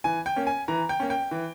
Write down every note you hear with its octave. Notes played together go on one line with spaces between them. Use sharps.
E3 G#5
G5
A#3 C#4
G#5
E3 A#5
G5
A#3 C#4
G5
E3